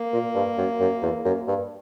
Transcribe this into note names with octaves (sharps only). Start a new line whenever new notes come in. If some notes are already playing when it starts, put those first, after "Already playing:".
Already playing: A#3
A#2
G2
F#2
F#2
E2
F#2
G2